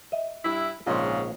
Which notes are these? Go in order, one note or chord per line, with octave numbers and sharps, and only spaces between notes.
D#5 E5
G2 E4
A#1 G#2 C#3 D#4 F4